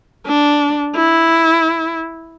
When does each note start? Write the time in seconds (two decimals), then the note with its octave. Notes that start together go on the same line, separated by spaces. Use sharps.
0.27 D4
0.96 E4